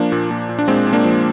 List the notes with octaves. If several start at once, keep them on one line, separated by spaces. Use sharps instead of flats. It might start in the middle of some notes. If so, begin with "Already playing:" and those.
Already playing: F3 A#3 D4
A#2
A#2
A#2
D4
A#2 G#3 C4
A#2
A#3 D4
F3